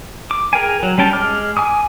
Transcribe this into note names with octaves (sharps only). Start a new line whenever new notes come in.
D6
G#4 A#4 G5 G#5
F#3
G3 C#4 G5 A5
G#3 D6 F6
G#5 D6 D#6